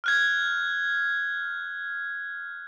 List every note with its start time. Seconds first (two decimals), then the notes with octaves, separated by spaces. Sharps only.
0.04 F6 F#6 G#6